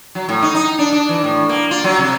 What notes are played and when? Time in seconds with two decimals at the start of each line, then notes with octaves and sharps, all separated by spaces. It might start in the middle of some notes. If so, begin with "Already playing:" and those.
0.15 F#3
0.29 A2
0.43 D#4
0.55 D#4
0.79 D4
0.92 D4
1.09 E3
1.24 A2
1.49 A#3
1.71 F4
1.84 F#3
1.98 C3